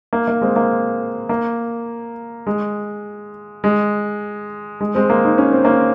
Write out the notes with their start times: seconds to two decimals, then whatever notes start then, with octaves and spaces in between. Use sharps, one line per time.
0.13 A#3
0.28 A#3
0.41 G#3 C4
0.56 A#3
1.29 A#3
2.47 G#3
3.64 G#3
4.81 G#3
4.95 G#3 C4
5.10 A#3
5.25 D#4
5.38 C#4
5.52 C4
5.64 A#3 C#4